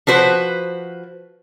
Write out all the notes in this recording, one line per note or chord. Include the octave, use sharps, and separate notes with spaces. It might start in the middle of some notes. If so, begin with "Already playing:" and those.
F3 F#4 B4 C5